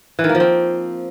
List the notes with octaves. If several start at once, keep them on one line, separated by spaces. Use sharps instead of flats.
E3
D#3
A#3
F3
C4